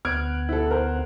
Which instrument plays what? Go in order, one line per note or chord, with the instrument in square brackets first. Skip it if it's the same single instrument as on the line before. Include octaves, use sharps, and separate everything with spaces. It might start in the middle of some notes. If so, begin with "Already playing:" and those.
[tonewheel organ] D2 B3 F#5 [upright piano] F6 G#6 D7
[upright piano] E4 A4
A#4 C5